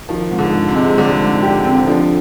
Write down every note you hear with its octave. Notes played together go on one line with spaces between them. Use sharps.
D#3 F3
G#2
D3
G#2
C3
G#3
D3 G3
G#2
G4
C4
D3 F3